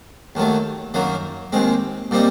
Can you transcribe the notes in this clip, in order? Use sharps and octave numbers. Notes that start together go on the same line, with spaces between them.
D#2 D#3 F#3 A3
F#2 D#3 F#3 A#3
D#2 D#3 G#3 C4
A#2 G3 C4 D#4